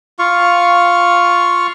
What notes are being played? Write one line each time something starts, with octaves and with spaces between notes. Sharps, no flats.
F4 F5 C#6